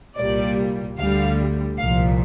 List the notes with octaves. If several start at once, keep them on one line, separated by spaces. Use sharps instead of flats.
C2 A#2 G3 A#3 D5
D2 D3 G3 F5
C2 A#2 F3 F5